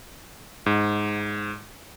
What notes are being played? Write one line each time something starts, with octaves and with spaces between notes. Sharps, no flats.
G#2